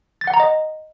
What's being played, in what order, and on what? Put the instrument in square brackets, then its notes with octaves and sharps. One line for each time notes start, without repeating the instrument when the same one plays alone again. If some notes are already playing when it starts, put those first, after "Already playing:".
[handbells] A6
F#5
A#5
D#5